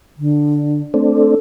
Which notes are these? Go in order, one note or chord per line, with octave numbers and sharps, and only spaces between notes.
D3
A3 C4 D4
A4